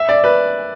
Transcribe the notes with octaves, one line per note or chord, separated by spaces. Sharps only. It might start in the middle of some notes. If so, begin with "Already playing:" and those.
Already playing: E5
D5
B4